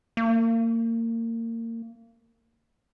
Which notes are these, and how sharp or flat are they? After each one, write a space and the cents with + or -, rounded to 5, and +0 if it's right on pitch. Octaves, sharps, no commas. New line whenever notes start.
A#3 -30